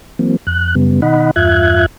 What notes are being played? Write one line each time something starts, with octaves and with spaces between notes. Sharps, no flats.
E3 F#3 A#3 C4
F2 F#6
F#2 C#3 G3 B3
B2 D#3 D#4 D#5 F#5 B5
E2 G2 F4 E5 F#6 G#6